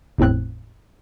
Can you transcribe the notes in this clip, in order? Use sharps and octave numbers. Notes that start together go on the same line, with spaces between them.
G1 E2 A2 C4 F#6